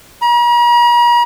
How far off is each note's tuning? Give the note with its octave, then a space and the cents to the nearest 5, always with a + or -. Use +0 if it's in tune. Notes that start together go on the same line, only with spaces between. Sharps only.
A#5 +45